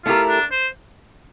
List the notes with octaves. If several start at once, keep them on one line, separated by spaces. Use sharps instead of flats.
A3 E4 F4 G4 A#4
D4
C5